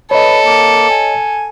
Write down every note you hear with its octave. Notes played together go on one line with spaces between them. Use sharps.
A4 B4 C#5 D#5
A#3
G#5